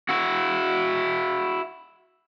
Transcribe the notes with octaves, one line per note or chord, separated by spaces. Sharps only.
E4 F#4